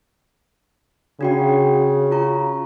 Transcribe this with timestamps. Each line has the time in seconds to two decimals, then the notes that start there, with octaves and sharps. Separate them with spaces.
1.21 C#3 D4 F#4 G5
2.11 F4 A#5 C#6